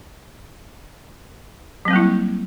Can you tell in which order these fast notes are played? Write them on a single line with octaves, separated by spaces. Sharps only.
F#3 C4 G3 A#3 E4